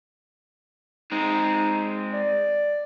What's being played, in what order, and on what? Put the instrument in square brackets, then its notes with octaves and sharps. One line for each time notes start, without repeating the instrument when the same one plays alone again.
[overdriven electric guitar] G#3 C4 [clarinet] D#4
[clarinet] D5